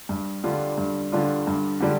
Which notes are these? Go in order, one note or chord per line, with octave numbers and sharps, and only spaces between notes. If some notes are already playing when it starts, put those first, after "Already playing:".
G2
D3 G3 D4 F4
G2
D3 G3 D4 F4
G2
D3 G3 D4